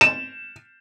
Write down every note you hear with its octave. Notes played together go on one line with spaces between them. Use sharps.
E7